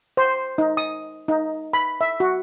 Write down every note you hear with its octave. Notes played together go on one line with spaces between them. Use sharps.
C5
D#4
D#6
D#4
B5
E5
F#4